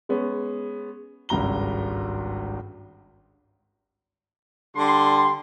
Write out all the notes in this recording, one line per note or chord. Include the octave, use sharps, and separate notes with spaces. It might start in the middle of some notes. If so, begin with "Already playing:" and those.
G#3 B3 C#4
G#1 C#2 G2 A#5 G7
D3 G3 C6